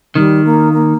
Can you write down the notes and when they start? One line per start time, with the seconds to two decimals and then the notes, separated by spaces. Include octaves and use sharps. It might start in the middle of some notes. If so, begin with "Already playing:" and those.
0.15 D#3 G3
0.44 A#3
0.73 A#3